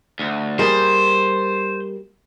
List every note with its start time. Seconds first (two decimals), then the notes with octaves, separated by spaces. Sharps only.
0.19 D2
0.59 G3 A#3 G#4 C5